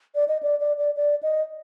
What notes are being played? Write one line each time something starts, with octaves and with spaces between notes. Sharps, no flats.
D5
D#5
D5
D5
D5
D5
D#5